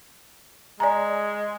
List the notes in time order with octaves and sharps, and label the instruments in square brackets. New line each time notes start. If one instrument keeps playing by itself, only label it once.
[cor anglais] G#3 [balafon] D5 G#5 A#5